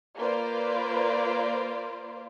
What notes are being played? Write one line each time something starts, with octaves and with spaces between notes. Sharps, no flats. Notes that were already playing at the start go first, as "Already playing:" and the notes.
A#3 F4 B4 C5 D5